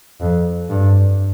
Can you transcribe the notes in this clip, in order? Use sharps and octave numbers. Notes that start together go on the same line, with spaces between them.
F2
G2